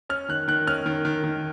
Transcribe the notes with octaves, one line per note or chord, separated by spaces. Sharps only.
C#4 F6
D#3 F#6
D#3 F#6
C#4 F6
D#3
D#3
D#3